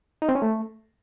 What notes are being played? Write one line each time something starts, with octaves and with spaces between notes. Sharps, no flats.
D#4
C4
C#4
A3